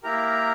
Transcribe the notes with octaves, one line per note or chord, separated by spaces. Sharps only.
A#3 E4 G4 A#4 A#5